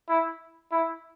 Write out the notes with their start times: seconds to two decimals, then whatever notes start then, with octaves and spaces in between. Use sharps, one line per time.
0.09 E4
0.72 E4